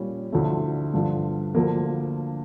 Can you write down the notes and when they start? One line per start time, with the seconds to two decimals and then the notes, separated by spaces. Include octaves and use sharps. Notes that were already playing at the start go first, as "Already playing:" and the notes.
Already playing: A#2 G3 C#4
0.32 D2 D3 F3 A3 E4
0.94 G2 D3 F3
1.54 D2 D3 F3 A#3